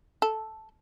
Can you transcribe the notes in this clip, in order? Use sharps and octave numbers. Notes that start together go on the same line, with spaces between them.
A4